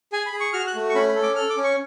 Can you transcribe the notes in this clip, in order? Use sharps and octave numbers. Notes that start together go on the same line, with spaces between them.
G#4 G#5
B5
G#4
C#6
F#4 F6
F#6
A3
C#6
C#4 B5
B5
A4
D6
A4 F6
D6
C#4
C#6